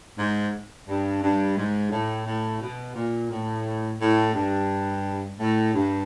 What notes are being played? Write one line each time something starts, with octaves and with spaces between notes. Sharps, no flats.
G#2
G2
G2
G#2
A2
A2
B2
A#2
A2
A2
G2
A2
G2